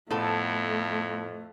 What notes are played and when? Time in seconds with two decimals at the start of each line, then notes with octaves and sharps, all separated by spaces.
0.11 F2 A2 A3 B3 A4